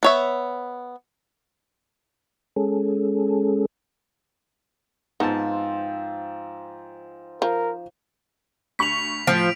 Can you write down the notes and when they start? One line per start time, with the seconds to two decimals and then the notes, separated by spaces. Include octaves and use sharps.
0.03 B3 C#5 E5
2.56 G#3 C#4 G#4 A4
5.20 G#2 F3 B3 C4 A5
7.42 F3 A#4
8.79 D2 C#6 B6 F7 F#7
9.27 A2 F3 D7